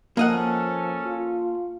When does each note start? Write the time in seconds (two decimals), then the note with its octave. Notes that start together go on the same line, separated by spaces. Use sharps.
0.17 F3 A#3 C#4 A4 D#5 F#5
1.06 F4